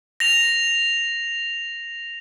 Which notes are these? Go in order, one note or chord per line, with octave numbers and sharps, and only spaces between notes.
A#6 F7